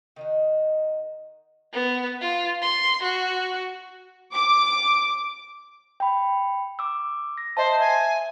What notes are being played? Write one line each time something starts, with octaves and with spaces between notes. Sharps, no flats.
D#3 D#4 F#4
B3
F4
C6
F#4
D6
G5 B5
D6 E6
A#6
C5 D#5 E5 A5
E5 G#5